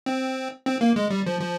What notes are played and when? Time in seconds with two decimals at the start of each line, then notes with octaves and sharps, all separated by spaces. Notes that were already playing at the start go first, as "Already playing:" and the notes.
0.06 C4
0.66 C4
0.81 A#3
0.96 G#3
1.10 G3
1.26 F3
1.41 F3